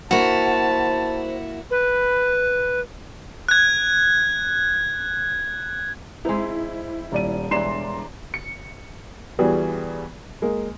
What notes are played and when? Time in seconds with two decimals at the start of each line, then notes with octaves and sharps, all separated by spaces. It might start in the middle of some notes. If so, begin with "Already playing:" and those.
0.11 A#3 E4 F#4 C5 A5
1.70 B4
3.48 F#6 G#6
6.25 G#3 C4 D#4 E4
7.12 D#1 D5 D#7
7.51 E1 G2 E3 D5 A#5 C6 C7 E7
8.34 C#7
9.39 E2 E3 G3 F#4 G#4
10.42 G#3 A#3